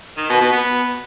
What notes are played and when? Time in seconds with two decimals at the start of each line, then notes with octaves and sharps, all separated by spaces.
0.17 D#3
0.29 B2
0.41 B2
0.53 B3